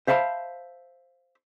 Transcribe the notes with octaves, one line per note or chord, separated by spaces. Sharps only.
C5 E5 F5 A5 B5